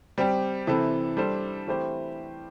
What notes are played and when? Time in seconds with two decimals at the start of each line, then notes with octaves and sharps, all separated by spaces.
0.18 G3 C4 G4
0.67 C3 E3 C4 A4
1.17 G3 D4 A4 C5
1.67 E3 A3 C4 G4 C5